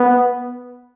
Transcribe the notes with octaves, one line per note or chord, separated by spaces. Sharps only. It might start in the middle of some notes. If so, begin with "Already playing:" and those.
Already playing: B3